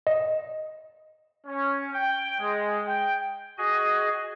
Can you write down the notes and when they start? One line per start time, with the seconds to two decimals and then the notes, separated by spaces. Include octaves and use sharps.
0.07 D#5
1.46 C#4
1.93 G5
2.40 G#3
2.86 G5
3.58 F#4 G#4 D#5 G#5